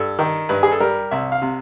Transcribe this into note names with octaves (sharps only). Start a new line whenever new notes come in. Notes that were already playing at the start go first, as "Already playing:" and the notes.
Already playing: G2 A4
D#3
G2 B4
G#4
A4
G3 A#4
C2 E5
F5
C3